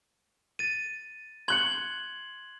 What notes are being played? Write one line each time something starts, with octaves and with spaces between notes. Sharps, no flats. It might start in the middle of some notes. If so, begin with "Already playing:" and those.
A6 D#7
C6 F#6 G#6 C#7 F#7 G7